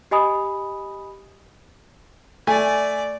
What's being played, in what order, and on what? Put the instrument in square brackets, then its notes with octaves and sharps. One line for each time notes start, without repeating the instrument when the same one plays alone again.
[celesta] G4 D#5 G#5 B5 D#6
[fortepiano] A3 G#5 [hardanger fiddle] D5